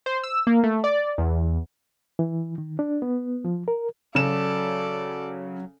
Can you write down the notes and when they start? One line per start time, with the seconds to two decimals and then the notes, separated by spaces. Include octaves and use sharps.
0.06 C5
0.23 E6
0.47 A#3
0.64 A3
0.84 D5
1.18 E2
2.19 E3
2.58 D#3
2.79 D4
3.02 B3
3.45 F3
3.68 A#4
4.15 C#3 F#3 A4 D5 E7